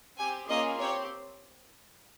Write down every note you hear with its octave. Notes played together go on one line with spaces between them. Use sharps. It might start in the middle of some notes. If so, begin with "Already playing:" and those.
C4 G4 G#5
A#3 C#4 F4 G#4 D#5
C4 G4 C#5